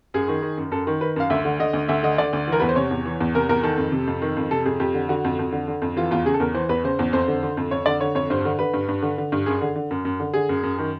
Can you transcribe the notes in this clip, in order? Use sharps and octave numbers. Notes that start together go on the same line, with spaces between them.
F#2 G#4
D#3
D#3
F#2
F#2 A4
D#3
D#3 B4
F#2 F5
D2 E5
D3
D3 D#5
D2
D2 E5
D3 D#5
D3 D5
D2
E3 A#4
E2 B4
C5
C3 C#5
E2
E3
E2
C3 A#4
E2 A#4
D#3 A4
F2
C3
F2
D#3
F2
C3 A4
F2 G#4
F2 G4
D3
D3 F#4
F2
F2
D3
D3
F2
E3 F4
E2 F4
C#3 G#4
A4
E2 A#4
E3 C5
E2 B4
C#3 C5
E2
F2 C5
D3
D3
F2
F2 C#5
D3 D5
D3 C#5
F2 C#5
G2 C5
D3
D3 B4
G2
G2
D3
D3
G2
F#2 G#4
D3
D3
F#2
F#2
D3
D3 G#4
F#2
F#2
D#3